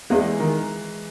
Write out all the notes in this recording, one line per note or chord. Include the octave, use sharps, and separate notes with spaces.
E2 E3 G#3
D#3